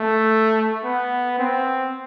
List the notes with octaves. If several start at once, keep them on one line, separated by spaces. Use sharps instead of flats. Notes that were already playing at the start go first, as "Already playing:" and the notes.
Already playing: A3
B3
C4